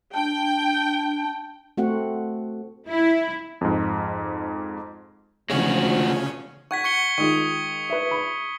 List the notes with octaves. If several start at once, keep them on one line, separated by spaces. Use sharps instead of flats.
D4 G5
A3 C4 F#4 F#5
E4
F2 G#2
D2 C#3 E3 F3 G#3 C#4 F#4
F#5 C#6 G#6 B6
C#6 C#7 G7
D#3 G#3 F4 C#6 D#6
B4 E5
B5